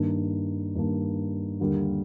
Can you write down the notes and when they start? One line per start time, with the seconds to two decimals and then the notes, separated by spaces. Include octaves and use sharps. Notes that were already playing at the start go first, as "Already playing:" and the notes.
Already playing: G2 D#3 A#3 D4
0.75 G2 D#3 A#3 D4
1.60 D#2 D3 G3 A#3